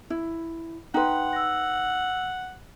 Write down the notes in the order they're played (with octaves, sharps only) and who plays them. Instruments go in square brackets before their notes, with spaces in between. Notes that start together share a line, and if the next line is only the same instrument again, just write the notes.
[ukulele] E4
[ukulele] D#4 B4 [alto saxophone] F#5 [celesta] G5 C6
[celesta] E6 A#6